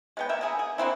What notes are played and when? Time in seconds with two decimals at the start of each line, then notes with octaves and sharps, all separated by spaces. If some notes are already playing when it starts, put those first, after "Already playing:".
0.17 G#3 B3 G5
0.29 A#3 E5
0.41 A#3 B3 G#4
0.59 G#4
0.78 D3 A#3 C4 E4